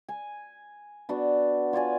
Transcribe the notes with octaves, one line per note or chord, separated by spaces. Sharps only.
G#5
B3 D4 F#4
F4 C#5 D5 G#5